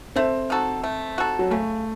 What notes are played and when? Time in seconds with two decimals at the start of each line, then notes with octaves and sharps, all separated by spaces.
0.16 A3 C4
0.50 D#4 F#4 A4
0.83 A3
1.18 D#4 F#4 A4
1.39 F#3
1.51 C#3 A3